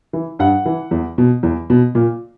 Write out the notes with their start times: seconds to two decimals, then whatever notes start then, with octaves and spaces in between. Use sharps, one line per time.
0.13 E3
0.39 G2 F#5
0.66 E3
0.91 E2
1.18 B2
1.43 E2
1.70 B2
1.95 A#2